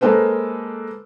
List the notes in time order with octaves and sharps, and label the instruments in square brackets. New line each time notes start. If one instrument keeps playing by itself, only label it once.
[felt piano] G#3 A#3 A4 B4 C5